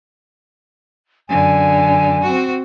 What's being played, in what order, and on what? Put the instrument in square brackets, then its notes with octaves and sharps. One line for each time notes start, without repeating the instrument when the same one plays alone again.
[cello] F#2 D3 [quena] G#5
[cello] C4 F#4